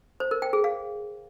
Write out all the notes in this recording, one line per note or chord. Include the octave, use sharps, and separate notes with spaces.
C5
A#4
G5
G#4
F5